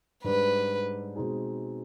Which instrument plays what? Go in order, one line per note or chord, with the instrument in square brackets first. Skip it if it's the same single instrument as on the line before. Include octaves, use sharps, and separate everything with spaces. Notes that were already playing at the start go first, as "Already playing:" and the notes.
[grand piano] G#2 G3 D4 [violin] B4
[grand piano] B2 G#3 C4 D#4 G#4